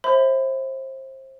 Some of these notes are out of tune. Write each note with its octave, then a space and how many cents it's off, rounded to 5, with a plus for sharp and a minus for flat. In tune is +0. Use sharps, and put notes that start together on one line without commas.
C5 +25 E5 -15 B5 +35